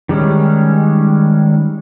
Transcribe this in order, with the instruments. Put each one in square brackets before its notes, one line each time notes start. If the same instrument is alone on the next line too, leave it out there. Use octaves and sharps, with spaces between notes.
[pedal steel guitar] D#3 G3 G#3 C#4